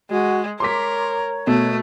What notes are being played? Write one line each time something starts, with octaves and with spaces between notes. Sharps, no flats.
G#3 F#4
A#4 C#5 C6 D6 B6
B2 A3